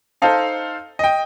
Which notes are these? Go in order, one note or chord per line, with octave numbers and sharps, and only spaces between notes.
D#4 A4 C5 D#5 F5 A5
D#5 G5